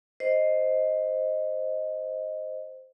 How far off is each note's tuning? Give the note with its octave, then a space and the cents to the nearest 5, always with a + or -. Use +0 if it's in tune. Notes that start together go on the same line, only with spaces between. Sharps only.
C5 +0 D#5 +0